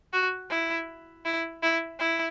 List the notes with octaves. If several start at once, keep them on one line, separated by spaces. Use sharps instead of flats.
F#4
E4
E4
E4
E4